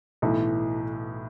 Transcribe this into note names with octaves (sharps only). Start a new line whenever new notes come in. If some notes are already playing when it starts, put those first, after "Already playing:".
B1 A2 E3